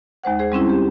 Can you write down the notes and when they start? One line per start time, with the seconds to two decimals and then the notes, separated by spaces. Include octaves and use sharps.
0.24 D#2 G#3 C5 F#5
0.39 G#4 C5
0.52 G3 C4 C#4 E4
0.69 G4